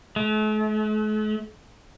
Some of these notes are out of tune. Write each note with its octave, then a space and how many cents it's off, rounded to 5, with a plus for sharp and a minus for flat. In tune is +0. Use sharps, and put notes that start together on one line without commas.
A3 -45